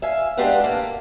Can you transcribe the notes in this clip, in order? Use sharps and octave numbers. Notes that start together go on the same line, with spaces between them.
E5 F5 G#5
G#3 D4 G4 B4 F5 F#5
A3 A#3